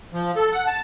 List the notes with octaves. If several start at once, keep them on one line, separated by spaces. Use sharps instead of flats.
F3
A4
F#5
A5